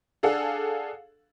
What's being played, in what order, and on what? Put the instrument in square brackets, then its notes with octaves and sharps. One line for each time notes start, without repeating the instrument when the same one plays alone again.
[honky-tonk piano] D4 G#4 A4 F5 F#5